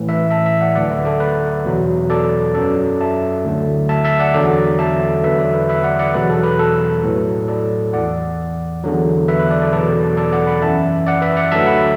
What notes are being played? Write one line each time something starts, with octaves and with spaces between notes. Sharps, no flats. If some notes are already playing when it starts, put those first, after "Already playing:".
Already playing: A2 E3
B4 E5
E5 A5
E5 A5
D5 F#5
D2 D3 F#3 D5 F#5
B4 E5
A4 D5
B4
E2 B2 F#3
A4 D5
F#2 F#3 A4 D5
E5 A5
D2 D3 F#3
E5 A5
E5 A5
D5 F#5
E2 D3 F#3 A4 D5
E5 A5
E2 D3 F#3 B4 E5
A4 D5
B4
B4 E5
D5 F#5
D5 F#5
E2 B2 F#3 B4
A4
B4
A4
A2 F#3
A4 D5
E2 E3 D5 F#5
E2 D3 F#3
B4 E5
B4
A4 D5
A4 D5
E2 B2 F#3 A4 D5
B4
A4 D5
A4 D5
D5 F#5
F#5 B5
F#2 E3 E5 A5
D5 F#5
B4 E5
D5 F#5
D2 D3 F#3 E5 A5
F#5 B5